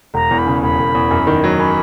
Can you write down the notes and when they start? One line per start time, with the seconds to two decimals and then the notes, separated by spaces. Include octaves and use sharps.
0.14 E1 A#5
0.31 E2
0.38 B5
0.47 C#3
0.62 E1 B5
0.79 E1
0.95 E2
1.11 F#2
1.27 D#3
1.44 F#3
1.59 C#4 B5